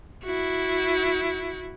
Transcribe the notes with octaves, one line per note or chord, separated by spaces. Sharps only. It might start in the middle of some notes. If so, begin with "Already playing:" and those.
E4 F#4